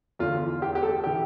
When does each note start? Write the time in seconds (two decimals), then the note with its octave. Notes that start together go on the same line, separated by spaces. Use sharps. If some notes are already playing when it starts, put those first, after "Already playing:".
0.19 E2 D3 F4
0.62 G4
0.75 G4
0.83 A4
1.04 E3 G4